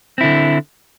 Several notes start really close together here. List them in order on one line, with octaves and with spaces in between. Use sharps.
C4 E4 D3